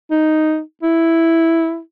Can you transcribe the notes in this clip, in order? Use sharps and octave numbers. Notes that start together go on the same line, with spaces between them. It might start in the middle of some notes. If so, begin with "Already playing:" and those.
D#4
E4